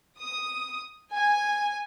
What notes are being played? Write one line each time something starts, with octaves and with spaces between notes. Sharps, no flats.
D#6
G#5